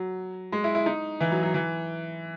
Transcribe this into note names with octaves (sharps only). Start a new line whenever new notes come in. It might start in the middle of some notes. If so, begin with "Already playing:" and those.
Already playing: F#3
G#3
E4
E4
D#4
E3
F#3
F#3
E3